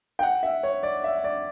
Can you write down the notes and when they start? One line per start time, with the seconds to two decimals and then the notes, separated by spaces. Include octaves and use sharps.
0.19 G5
0.23 F#5
0.43 E5
0.63 C#5
0.83 D5
1.04 E5
1.24 D5